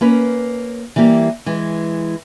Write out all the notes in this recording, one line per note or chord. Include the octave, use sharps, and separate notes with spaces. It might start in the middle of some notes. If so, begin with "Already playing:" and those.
A#3 C#4 B4
E3 G3 A#3 G4
E3 G#3